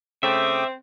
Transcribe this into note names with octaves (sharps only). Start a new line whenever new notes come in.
C#3 A3 C4 E5 G5 D6 D#6